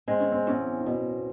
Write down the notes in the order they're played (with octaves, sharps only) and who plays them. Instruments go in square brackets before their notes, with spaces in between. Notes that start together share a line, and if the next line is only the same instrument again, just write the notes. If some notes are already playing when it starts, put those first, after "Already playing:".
[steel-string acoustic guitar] G#3 [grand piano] C4
[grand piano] C#4
C4
[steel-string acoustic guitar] E2 [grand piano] C#4
[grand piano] C#4
[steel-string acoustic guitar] B2 [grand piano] C4